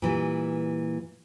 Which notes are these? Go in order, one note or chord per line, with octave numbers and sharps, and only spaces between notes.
A#2 E3 G3